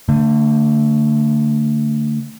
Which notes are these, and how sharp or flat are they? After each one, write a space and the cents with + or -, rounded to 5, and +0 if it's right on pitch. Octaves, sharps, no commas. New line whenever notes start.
D3 -5 A3 +30